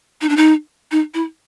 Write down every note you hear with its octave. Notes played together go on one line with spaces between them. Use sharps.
D#4
D4
D#4
D#4
E4